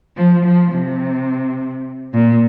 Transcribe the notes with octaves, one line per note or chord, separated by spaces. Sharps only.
F3
F3
C3
A#2